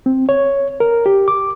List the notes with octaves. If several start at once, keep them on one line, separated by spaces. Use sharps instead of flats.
C4
C#5
A#4
G4
D6